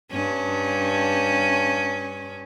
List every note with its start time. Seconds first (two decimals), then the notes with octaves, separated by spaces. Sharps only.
0.11 G2 C#4